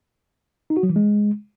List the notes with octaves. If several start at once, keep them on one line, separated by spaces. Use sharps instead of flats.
D#4
F#4
F#3
E3
G#3